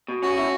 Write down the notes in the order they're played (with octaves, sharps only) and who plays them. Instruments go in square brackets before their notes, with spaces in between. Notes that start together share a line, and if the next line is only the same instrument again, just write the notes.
[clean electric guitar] B2
[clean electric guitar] C#4 [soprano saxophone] F#4
[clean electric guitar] E4